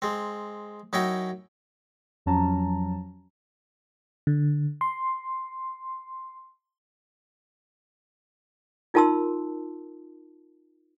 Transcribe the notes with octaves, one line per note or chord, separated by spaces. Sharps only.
G#3 C4
F#2 D#4 E4 C#5 G5 B5
F2 F3 F#3 C#4 A5 A#5
D3
C6
D#4 F4 A#4 A5 C6 E6